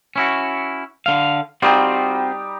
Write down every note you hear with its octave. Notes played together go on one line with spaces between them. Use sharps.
C#4 E4 F#4
D3 F5
G3 C4 D#4 F4 F#4 G5